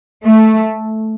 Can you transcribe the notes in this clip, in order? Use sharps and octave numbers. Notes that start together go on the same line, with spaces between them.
A3